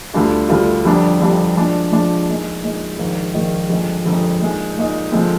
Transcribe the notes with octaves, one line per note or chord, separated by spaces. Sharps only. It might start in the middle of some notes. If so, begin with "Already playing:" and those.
D2 D3 G3 D4 F4
D2 D3 G3 D4 F4
G1 F2 D3 G3 D4
G1 F2 D3 G3 D4
A#2 F3 G#3 D4
A#2 F3 G#3 D4
A#2 G#3 D#4
A#2 G#3 D#4
A#1 G#2 D#3
A#1 G#2 D#3
G1 F2 D3 G#3
G1 F2 D3 G#3
A#2 G#3 D#4
A#2 G#3 D#4
D3 F3 G#3 C4